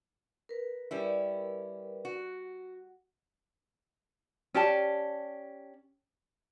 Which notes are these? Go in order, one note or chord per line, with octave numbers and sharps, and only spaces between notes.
A#4 B4
G3 C#4 E4
F#4
C#4 G4 D5 A5